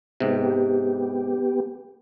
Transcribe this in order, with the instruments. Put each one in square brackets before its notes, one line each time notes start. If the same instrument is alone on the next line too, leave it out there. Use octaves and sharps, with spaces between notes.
[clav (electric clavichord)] G#2 C3 [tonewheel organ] B3 G4